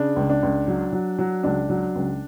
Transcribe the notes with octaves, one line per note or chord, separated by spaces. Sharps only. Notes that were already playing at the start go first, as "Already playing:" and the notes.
Already playing: C#3 D4
C#2
D4
C#2
F#3
F#3
F#3
C#2 D4
F#3
C#2